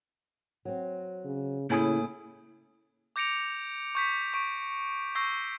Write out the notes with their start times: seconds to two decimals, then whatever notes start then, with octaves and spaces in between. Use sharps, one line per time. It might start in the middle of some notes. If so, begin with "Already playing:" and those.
0.65 F#3 C4
1.25 C#3
1.70 A2 C#3 A#3 E4 G#5 D#6
3.16 D6 G6 A#6 C#7 D7 F7
3.95 C#6 G6 B6
4.34 C#6 D7
5.15 C#6 E6 G6 A#6 C7